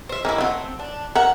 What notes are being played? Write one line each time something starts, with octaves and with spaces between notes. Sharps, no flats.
C5 E5
D#3 A#3 C#4 E4
F#3 A3 C4 F#5
D4
A#4 E5 F#5 A#5